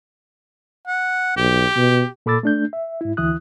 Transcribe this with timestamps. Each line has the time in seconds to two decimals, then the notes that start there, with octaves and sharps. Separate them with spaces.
0.87 F#5
1.37 B1 G4
1.77 B2
2.26 A#2 A4 B5 D6 E6 A6
2.43 A3 D4 G6
2.73 E5
3.01 G#2 E4
3.17 D2 E3 E4 D#6 F#6